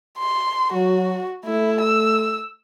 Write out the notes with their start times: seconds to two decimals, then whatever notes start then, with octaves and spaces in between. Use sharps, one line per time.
0.18 C6
0.73 F#3 F#4
1.46 A3 E4
1.81 E6